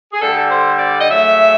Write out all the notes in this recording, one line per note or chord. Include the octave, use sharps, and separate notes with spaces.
G#4
D3 G3 A4
C5
D5
D#5
C#3 F#3 A3 E5